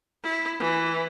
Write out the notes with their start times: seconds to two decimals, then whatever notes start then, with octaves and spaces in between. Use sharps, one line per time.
0.23 E4
0.60 E3